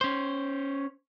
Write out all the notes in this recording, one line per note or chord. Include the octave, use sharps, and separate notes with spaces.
C#4 C5